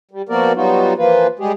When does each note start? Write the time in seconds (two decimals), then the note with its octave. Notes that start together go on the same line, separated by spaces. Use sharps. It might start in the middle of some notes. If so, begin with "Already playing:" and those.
0.11 G3
0.29 F3 A#3 B3 F#4 A#4 D5
0.55 F#3 G3 B3 D#4 F4 F#4
0.97 E3 F3 A#3 F4 B4
1.39 G3 G#3 G4 G#4